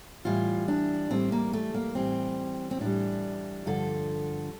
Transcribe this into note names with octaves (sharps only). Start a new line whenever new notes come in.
A2 E3 G3 F4
D4
A2 E3 G3 C4
A#3
A3
A#3
A2 E3 G3 C4
C4
A2 E3 G3 D4
G2 D3 F3 A4